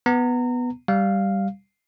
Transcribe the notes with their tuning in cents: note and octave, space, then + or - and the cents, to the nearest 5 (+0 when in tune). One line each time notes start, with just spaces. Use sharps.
B3 +0 A#5 -30
G3 +0 F5 +0